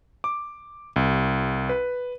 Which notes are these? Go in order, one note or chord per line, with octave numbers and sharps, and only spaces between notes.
D6
C2
B4